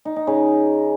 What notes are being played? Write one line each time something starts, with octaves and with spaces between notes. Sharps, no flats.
D#4
D#4
C#3